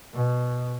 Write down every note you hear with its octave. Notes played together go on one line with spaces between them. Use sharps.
B2